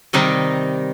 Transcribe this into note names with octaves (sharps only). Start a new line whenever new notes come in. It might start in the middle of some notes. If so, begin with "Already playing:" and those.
C3 D#3 G3 D#4